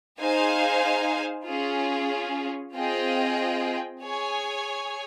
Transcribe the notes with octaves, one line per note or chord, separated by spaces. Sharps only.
D#4 G#4 C5 F5 G#5
C#4 F4 G#4
C4 F4 G#4 D#5 G5
G#4 C#5 G#5